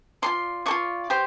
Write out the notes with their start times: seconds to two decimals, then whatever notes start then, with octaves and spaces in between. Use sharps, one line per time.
0.22 F4 A4 D5 C6
0.66 F4 A4 D5 C#6
1.10 G4 C5